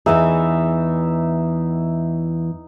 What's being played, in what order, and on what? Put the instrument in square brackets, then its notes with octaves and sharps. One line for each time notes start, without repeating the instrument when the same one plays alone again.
[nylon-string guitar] E2 E3 G#4 [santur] D#4 E5 F#5